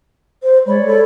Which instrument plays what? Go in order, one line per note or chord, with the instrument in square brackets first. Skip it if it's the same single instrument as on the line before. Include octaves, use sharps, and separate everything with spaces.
[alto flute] C5
[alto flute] G#3 [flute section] C#5 D5 B5
[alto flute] A4